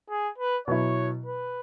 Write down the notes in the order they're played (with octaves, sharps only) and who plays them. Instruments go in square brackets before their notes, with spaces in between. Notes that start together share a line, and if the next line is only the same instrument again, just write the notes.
[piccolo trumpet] G#4
B4
[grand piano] B2 F#3 E4 [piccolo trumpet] C#5
[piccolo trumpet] B4